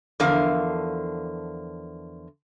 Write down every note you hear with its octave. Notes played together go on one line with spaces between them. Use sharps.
E2 D3 F3 A#4 F5